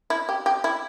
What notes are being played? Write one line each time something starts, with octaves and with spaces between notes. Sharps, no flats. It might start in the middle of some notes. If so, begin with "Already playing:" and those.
E4
G4
G4
E4